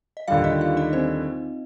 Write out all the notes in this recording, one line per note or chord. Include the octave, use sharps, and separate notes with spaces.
D#5
D#2 D3 G3 F4 F5
D#4 D#5
F4 F5
D#4 D#5
C4 C5